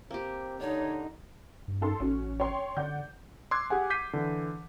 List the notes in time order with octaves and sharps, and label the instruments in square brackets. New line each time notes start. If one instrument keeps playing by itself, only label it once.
[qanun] A#3 G4 [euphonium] C4
[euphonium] D3 [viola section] D#4 [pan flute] C#5
[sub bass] G2
[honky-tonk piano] D#4 A4 C6
[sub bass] A1 [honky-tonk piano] C#4 F#4
[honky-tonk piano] C#5 G5 C6
[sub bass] D3 [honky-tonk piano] D5 F#5 G6
[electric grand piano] C6 D6 E6 F#6 G#6
G4 G#4 F#5 G#5
D6 G6 B6 C7 D#7
D3 E3